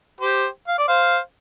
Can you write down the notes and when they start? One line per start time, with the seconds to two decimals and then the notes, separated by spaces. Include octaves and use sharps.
0.20 G4 C5
0.68 F5
0.78 D5
0.88 C5 F5